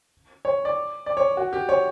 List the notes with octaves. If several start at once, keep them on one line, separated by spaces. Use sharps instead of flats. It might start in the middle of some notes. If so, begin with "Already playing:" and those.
C#5
D5
D5
C#5
F#4
G4
C#5